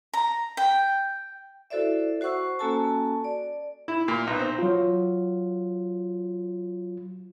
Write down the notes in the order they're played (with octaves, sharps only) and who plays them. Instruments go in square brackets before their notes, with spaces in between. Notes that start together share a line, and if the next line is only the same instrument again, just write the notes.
[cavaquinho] A#5
G5
[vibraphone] E4 F#4 A4 C5 D5 E5
F#4 C5 F#5 C#6 E6
A#3 C#4 F#4 A4 G#5 A5
D5
[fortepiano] E4
A#2
B1
C4
[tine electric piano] F#3 F4